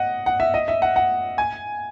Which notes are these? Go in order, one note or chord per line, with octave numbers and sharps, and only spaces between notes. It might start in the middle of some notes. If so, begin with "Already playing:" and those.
Already playing: D#5 F#5
F#5
E5
D#5
E5
F#5
F#5
G#5